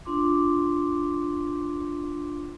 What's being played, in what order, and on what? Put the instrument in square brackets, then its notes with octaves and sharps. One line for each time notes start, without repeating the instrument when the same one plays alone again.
[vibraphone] D4 F4 C6 D6